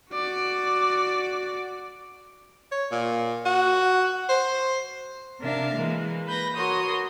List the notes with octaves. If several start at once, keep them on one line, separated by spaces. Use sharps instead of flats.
F#4 D5
C#5
A#2
F#4
C5
C3 D4 A#4 E5 F5
E3 G#3 A#3
B4 G6 A#6
F#4 A#4 C#5 C6 D#6